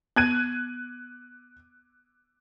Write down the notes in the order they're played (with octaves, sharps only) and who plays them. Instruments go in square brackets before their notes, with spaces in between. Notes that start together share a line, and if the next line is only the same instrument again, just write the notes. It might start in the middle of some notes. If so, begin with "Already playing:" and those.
[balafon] B3 [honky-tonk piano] F#6 G#6 D#7